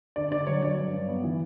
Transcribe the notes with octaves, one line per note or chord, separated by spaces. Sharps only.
D3 D5
D3 D5
F#3 C#5
F#3 D5
G2
G2
B3
E3